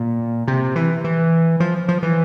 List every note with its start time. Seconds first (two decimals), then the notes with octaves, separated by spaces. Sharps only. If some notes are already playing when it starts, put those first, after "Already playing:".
Already playing: A#2
0.48 C3
0.76 E3
1.04 E3
1.60 F3
1.88 F3
2.03 E3